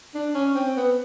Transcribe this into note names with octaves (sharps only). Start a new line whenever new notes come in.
D4
C#4
C4
B3